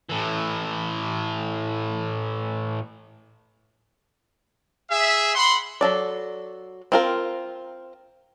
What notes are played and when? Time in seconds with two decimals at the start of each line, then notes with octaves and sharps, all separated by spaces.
0.09 A2 E3
4.90 G#4 E5
5.35 F#5 B5 C6
5.81 F#3 A4 D5
6.92 C4 F4 A#4